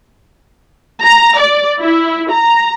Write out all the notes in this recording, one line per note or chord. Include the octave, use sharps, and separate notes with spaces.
A#5
D5
E4
A#5